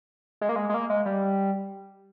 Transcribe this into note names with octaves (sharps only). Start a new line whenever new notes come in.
G#3
A#3
G#3
G#3
A#3
G#3
G3